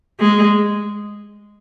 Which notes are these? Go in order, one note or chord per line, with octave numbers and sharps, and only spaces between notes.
G#3